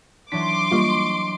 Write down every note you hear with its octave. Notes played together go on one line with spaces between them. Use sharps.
E3 F#3 D4 C6 D6 B6
G3 A#3 F4 D#5 C#6